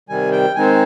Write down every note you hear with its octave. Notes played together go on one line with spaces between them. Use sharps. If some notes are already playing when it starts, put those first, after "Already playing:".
C3 D#3 G3 G#5
G5
D#3 G#3 C4 D#4 G#5